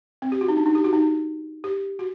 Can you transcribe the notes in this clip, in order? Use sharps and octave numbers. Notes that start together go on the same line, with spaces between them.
C4
G4
F#4
D#4
D4
D#4
G4
F#4
D#4
G4
F#4